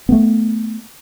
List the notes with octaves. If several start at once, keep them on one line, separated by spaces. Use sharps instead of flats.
A3 B3